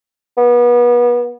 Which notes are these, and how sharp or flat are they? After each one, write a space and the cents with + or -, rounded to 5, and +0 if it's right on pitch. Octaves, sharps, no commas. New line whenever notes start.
B3 -30